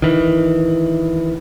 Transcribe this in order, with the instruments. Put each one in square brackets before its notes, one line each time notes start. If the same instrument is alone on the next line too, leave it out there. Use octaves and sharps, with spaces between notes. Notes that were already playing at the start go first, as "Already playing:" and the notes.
[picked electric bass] D#3 E3